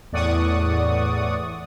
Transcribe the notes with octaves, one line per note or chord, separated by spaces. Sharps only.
E2 A2 D5 F#5 C#6 D#6